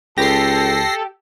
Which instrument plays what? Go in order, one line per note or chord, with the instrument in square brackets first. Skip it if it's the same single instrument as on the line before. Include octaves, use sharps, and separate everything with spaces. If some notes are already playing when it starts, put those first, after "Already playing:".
[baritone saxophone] C#2 [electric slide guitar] G4 [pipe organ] A4 [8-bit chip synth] A#6 C7